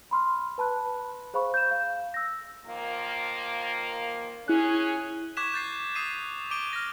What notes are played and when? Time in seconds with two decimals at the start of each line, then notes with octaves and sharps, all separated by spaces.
0.11 B5 C6 F6
0.58 B4 A5 B5 F#6
1.34 G#4 C5 F5 B5 C#6
1.54 G6 E7
1.71 F5
2.14 E6 A#6
2.66 D#3 F3 A#3
4.48 C#4 E4 G#4 F#6
5.37 C#6 D6 F#6 G#6 B6 E7
5.53 G6 A6 C7
5.95 D#6 C7 D#7
6.09 C7
6.51 D6 G6 D7 D#7 G7
6.73 F6 A#6